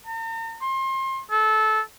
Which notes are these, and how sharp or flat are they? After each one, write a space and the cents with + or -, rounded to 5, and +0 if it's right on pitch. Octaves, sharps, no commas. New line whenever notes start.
A#5 -45
C6 +30
A4 -20